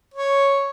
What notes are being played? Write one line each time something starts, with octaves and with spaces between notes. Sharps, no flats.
C#5